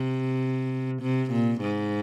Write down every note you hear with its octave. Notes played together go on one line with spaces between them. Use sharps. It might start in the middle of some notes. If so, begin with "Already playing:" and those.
Already playing: C3
C3
A#2
G#2